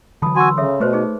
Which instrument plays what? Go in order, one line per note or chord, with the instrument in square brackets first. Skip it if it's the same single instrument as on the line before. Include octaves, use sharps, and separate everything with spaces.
[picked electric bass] D3 E3 F#3 [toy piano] A5 B5 D#6
[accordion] F#4 G#5 [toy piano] C6 E6
[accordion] C#3 [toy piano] A4 C#5 E5
[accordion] B2 [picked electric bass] A3 [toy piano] A4 B4 C5
[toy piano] D#4 G#4